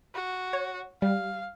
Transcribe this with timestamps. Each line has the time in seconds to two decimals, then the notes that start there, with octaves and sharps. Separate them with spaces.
0.15 F#4
0.53 C#5
1.02 G3 F5